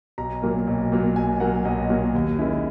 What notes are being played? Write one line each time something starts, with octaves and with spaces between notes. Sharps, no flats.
B1 A#5
A#2 F#3 A#3
B1
A#2 F#3 A#3
B1 G#5
A#2 F#3 A#3 F#5
B1 D#5
A#2 F#3 A#3
D#2
D#3 G#3 C#4 E4